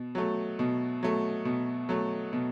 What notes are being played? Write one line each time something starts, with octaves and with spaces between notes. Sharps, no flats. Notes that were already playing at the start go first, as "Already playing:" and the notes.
Already playing: B2
F#3 A3
B2
F#3 A3
B2
F#3 A3
B2